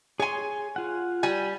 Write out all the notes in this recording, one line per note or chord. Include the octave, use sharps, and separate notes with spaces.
G#4 C#5 G#5 C6
F4 F#5
G3 G#5